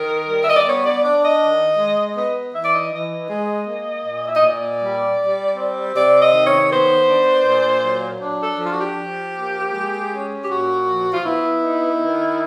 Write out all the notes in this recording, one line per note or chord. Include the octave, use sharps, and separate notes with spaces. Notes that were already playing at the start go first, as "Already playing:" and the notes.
Already playing: D#3 A#4
G3
E5
D#5
D5
B3 C#5
D5
D4 D5
D#5
D#3
G#3
B3 D#5
E3 E5
D5
D#5
E3 D#5
G#3
A#3
A#2
E5
D#5
A#2 D5
G3
G3
C4
C3 D5
D#5
D#3
C#5
B3 C5
D4
A#2
F#3
D4
A4
F3 F4
F#4
G4
F3
A#3
G#3
C#4
G4
A#2 F#4
F3
F4
B3 E4
D#4
D#3